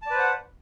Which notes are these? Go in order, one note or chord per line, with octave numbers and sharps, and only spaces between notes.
B4 C5 D5 F#5 A5